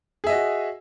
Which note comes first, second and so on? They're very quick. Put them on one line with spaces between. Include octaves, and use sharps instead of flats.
G#4 E5 D#5 F#4